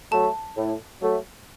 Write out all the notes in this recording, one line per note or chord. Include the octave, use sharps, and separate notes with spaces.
F#3 A3 A5
A2
F#3 A3